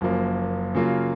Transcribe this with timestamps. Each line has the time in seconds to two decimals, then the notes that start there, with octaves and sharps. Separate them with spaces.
0.01 F#1 F#2 F3 A#3
0.75 C#3 F#3 A#3 F4